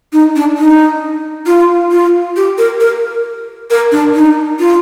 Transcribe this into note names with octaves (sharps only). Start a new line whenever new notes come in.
D#4
D4
D#4
F4
F4
G4
A#4
A#4
A#4
D4
D#4
F4